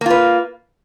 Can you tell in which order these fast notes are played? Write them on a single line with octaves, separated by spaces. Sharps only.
A#3 F4 B4